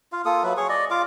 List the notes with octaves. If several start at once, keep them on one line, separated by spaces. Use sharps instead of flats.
F4 F5
A#3 F4 A4 D#6
F#3 B4 E5
G#4 C#5 C#6
D5 D#5
F4 F5 D6